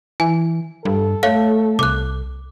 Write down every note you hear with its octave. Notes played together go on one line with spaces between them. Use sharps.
E3 G#5
G2 A4
A3 C#5 F5
C2 D6 F#6